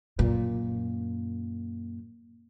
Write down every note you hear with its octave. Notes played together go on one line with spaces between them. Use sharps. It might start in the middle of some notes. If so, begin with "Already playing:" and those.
F#2 A#2